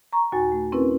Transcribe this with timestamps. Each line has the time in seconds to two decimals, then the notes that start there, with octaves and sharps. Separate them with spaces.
0.13 A#5 C#6
0.32 D#2 A#2 F#4 G#5 A6
0.52 A3
0.72 C4 C#4 E4 A#4 B4